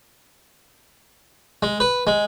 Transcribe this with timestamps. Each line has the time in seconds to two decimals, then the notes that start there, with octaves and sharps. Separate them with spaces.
1.63 G#3
1.80 B4
2.07 G#3